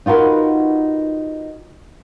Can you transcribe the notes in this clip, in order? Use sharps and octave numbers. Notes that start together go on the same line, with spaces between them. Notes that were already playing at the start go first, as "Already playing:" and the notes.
D#4 F4 F#4 A#4 B4